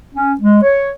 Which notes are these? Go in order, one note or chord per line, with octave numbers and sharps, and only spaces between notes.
C#4
G#3
C#5